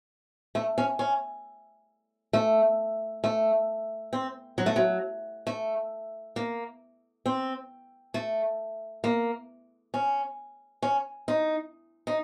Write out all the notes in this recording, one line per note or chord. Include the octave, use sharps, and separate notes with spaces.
A3
C#4
C#4
A3
A3
C4
F#3
A3
F#3
A3
A#3
C4
A3
A#3
C#4
C#4
D#4
D#4